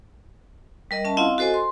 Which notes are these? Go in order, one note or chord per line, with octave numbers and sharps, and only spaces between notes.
G3 A#4 D#5
C#4 E5 A5
C4 E4 F4 D#5 F5 F#5
F#4 A4 C5 D#5 G#5
C6